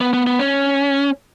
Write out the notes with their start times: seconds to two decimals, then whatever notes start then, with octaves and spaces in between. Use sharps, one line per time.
0.01 B3
0.13 B3
0.26 B3
0.39 C#4